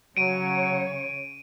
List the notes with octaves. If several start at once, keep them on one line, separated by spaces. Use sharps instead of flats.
C#3 F#3 C#5 D7 D#7